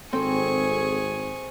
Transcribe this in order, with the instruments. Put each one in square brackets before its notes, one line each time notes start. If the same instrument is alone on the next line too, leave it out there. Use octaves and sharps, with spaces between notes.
[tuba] G#1 [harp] C4 [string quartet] G#4 G#5 C#6 [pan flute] A4